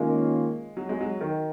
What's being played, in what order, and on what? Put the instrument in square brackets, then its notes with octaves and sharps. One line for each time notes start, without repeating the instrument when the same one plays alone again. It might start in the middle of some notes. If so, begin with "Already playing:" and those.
Already playing: [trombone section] D#3 A#3 C#4 F4 [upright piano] G#3
[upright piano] F#3
G#3
F#3
D#3